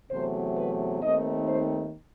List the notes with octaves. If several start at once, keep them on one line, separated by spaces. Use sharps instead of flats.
E2 C3 F#3 A3 C5
B4
D#2 D#3 A3 C4 D#4 D#5
C5